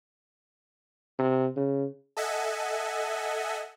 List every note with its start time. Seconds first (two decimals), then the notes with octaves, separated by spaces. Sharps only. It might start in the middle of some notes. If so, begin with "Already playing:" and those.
1.18 C3
1.56 C#3
2.17 A4 D#5 E5 F#5 G#5